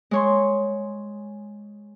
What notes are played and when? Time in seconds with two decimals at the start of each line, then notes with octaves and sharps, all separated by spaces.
0.11 G#3 C#5 C6